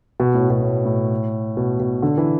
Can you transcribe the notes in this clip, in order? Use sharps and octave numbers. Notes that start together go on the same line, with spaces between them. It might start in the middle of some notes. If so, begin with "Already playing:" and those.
B2
A2
B2
A2
A2
B2
B2
D3
E3